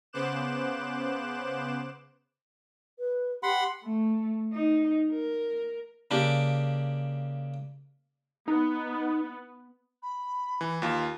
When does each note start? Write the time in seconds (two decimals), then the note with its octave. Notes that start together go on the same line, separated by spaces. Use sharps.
0.13 C#3 B3 C5 D6 F#6 E7
2.99 B4
3.43 G4 F#5 B5 C6
3.83 A3
4.53 D#4
5.11 A#4
6.11 C#3 A#3 D4 G4
8.48 B3 D#4
10.02 B5
10.61 E3
10.82 D#2 F4